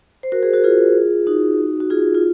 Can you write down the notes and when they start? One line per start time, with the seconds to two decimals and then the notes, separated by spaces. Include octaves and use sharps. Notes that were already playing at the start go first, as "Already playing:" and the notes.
0.23 C5
0.32 F#4 A#4
0.43 G#4 C5
0.53 F#4 A#4
0.64 F4 G#4
1.27 D#4 F#4
1.80 F#4
1.90 F4 G#4
2.15 F4